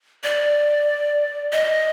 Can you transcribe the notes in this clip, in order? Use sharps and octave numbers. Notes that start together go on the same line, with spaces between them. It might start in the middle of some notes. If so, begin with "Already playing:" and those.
D5
D#5